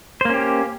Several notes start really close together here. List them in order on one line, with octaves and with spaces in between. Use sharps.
C5 A#3 C#4 G4